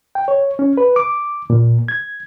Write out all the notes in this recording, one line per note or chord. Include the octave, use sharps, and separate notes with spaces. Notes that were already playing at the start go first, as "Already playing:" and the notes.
G5
C#5
C#4
B4
D6
A#2
G#6